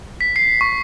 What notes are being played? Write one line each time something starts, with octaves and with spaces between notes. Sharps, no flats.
B6
C7
C#6